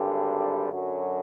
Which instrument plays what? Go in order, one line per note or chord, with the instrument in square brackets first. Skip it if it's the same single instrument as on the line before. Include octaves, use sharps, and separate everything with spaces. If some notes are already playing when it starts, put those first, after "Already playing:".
Already playing: [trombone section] G#1 G2 D3 G3
F#2 D3 F#3